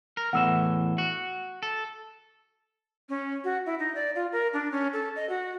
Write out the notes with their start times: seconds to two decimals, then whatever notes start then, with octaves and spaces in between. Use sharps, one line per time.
0.17 A#4
0.33 E2 A2 E3 F#5 E6 E7
0.98 F#4
1.63 A4
3.09 C#4
3.44 F#4
3.66 E4
3.79 D#4
3.95 D5
4.15 F4
4.32 A#4
4.53 D4
4.72 C#4
4.93 A4
5.16 D#5
5.29 F#4